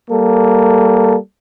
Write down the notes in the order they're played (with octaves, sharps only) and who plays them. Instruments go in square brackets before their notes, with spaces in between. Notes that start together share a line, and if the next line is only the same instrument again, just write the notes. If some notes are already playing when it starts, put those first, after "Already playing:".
[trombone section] G3 A#3 A4